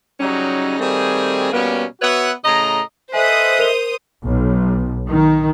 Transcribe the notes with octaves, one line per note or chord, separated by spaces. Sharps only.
C#3 F#3 G3 C#4 D#4
D#3 G3 A3 C4 G#4
B2 G3 A#3 B3 C#4
B3 F#4 B4 C#5 E5 F#5
A2 C#3 D#5 A#5
A4 B4 C5 D#5 E5 G#5 D#6
A#4 F7 G7
B1
D#3